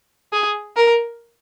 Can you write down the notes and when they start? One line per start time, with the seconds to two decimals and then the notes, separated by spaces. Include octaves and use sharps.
0.32 G#4
0.76 A#4